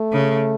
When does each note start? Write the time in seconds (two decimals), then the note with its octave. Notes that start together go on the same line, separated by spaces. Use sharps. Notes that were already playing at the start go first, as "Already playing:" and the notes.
Already playing: A3
0.13 C#3